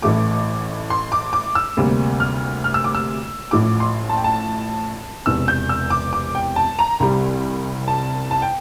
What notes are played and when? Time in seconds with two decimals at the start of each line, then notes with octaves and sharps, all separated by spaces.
0.02 A1 A2 E3 A3 D6
0.90 C6
1.12 D6
1.33 D6
1.55 E6
1.77 D2 C3 G3 A#3
2.20 F6
2.64 F6
2.74 E6
2.84 D6
2.95 E6
3.51 A1 A2 F3 D6
3.80 C6
4.09 A5
4.17 G5
4.24 A5
5.26 E1 E2 C3 E6
5.48 G6
5.69 E6
5.90 D6
6.13 D6
6.35 G5
6.56 A5
6.79 A#5
7.00 C2 C3 G3
7.88 A5
8.31 A5
8.42 G5